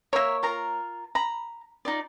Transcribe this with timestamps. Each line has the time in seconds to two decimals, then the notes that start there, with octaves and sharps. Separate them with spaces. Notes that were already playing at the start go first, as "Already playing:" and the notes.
0.13 A#3 A#4 C#5 E5
0.43 F4 A#4 A#5
1.15 A#5 B5
1.85 D#4 F4 D5